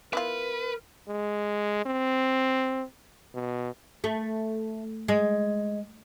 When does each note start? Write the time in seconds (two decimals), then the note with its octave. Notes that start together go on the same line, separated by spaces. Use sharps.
0.13 B3 E4 F4 A#4 B4
1.08 G#3
1.86 C4
3.34 B2
4.04 A3
5.08 G#3